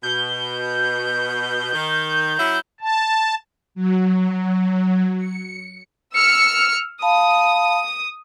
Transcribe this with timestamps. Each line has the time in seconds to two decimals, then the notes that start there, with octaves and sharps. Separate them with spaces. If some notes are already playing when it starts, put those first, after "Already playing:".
0.03 B2 G6
1.73 D#3
2.39 F#3 C#4 E4
2.81 A5
3.75 F#3
5.17 C#7
6.16 E6 F6 C#7
7.02 F5 A5 B5 D#6